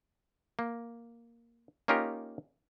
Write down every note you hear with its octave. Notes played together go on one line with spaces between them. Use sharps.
A#3
A#3 C#4 D#4 F4 G4 A#4